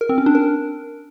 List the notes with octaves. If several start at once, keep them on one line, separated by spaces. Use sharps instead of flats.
A#4
C4
C#4
D4
A#4